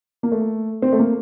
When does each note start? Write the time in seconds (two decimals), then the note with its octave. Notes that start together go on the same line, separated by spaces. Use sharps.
0.23 A#3
0.32 A3
0.82 C4
0.93 A3
0.99 A#3